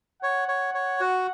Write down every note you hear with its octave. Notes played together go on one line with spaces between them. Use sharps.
C#5 F#5
C#5
C#5
F#4